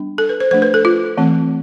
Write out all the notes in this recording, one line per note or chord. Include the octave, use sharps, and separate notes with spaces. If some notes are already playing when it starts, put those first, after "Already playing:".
Already playing: G3 B3 D4
A4
B4
C5
F3 A3 D4 C5
B4
A4
F4
E3 A3 C4